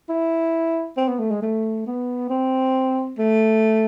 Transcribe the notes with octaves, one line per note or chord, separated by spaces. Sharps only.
E4
C4
B3
A3
G#3
A3
B3
C4
A3